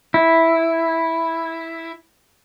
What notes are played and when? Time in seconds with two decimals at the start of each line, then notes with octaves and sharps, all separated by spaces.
0.14 E4